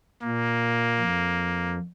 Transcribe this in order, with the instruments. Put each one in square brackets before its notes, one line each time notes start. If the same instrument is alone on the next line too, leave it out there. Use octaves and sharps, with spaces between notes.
[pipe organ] A#2 [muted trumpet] A#3
[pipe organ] F2